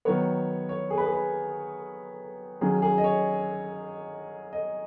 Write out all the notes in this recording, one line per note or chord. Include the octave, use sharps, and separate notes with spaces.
D#3 F#3 B3 C#5
C#5
G#4
B4
G#4
B4
D#3 F#3 C#4 G#4
G#4
D#5
C#5
D#5